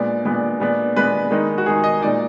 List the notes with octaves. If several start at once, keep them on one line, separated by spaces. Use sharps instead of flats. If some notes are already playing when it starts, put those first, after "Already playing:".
Already playing: A#2 G#3 B3 D4 D5
A#2 G#3 B3 D4
A#2 G#3 B3 D4
A#2 G#3 B3 D4 B4
D#3 G#3 D#4
F#4
D#3 G#3 D#4 G#4
D#5
A#2 G#3 D#4 D5